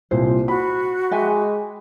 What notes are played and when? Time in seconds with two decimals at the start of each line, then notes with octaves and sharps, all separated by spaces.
0.11 C2 A#2 C5
0.48 F#4 B5
1.11 G#3 G4 E5 G#5